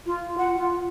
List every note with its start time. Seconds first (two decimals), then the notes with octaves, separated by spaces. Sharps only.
0.06 F4
0.38 F#5
0.57 F4